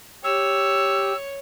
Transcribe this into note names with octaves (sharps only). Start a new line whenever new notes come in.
G4 C#5 E6